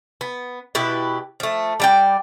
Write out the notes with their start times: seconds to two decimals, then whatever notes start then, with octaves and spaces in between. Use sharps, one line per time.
0.21 B3
0.75 B2 E4 G4 B4
1.40 F3 A3
1.80 G3 D5 G5